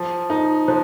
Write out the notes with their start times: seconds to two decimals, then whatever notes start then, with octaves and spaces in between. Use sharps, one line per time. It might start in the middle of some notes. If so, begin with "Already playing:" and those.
Already playing: F3
0.30 D#4
0.68 F3